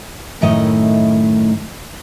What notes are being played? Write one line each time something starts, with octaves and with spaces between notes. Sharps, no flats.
F#2 A2 D#3 A3 E4 D#5